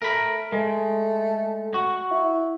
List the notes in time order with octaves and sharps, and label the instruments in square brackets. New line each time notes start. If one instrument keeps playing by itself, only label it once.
[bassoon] A3 [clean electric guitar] A#4 B5
[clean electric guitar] G#3 [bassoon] A3
[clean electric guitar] F#4
[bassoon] E4